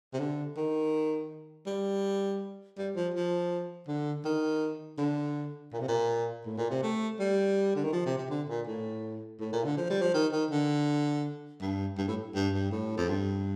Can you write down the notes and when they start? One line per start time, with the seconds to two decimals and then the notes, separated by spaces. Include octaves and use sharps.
0.13 C3
0.19 D3
0.57 D#3
1.67 G3
2.78 G3
2.96 F3
3.14 F3
3.87 D3
4.25 D#3
4.98 D3
5.72 A#2
5.80 C3
5.88 A#2
6.46 A2
6.58 A#2
6.70 C3
6.83 A3
7.19 G3
7.76 D3
7.84 D#3
7.93 F3
8.05 C3
8.18 C3
8.30 D3
8.49 A#2
8.67 A2
9.40 A2
9.53 A#2
9.64 D3
9.77 F3
9.90 G3
10.02 F3
10.14 D#3
10.32 D#3
10.51 D3
11.61 G2
11.98 G2
12.08 A2
12.35 G2
12.53 G2
12.72 A2
12.97 F2
13.09 G2